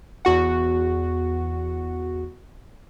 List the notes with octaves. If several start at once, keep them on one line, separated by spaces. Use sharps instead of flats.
E2 F#4 F#5